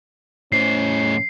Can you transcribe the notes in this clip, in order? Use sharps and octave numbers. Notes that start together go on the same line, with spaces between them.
A2 C#4 C5 C7